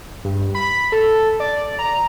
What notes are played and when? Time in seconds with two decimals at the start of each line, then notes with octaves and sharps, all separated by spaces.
0.24 G2
0.55 B5
0.92 A4
1.40 D5
1.79 A#5